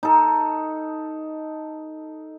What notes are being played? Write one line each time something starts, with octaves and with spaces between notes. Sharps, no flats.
D#4 A4